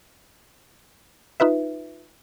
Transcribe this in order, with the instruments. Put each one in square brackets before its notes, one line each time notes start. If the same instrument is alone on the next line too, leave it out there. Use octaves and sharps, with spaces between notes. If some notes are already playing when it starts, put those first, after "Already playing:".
[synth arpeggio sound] D#4 F4 B4 E5